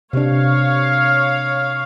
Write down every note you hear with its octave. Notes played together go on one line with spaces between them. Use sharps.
C3 D4 C#5 F5